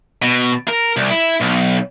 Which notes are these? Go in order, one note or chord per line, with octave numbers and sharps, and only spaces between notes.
B2
A#4
C2
E4
B1